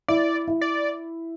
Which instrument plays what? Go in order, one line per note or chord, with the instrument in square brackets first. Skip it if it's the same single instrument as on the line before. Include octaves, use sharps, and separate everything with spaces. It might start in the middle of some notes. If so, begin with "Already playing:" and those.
[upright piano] E4 [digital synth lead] D5
[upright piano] E4
[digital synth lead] D5